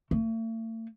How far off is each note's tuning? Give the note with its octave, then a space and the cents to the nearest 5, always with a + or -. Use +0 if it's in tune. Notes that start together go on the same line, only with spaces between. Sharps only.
A3 +45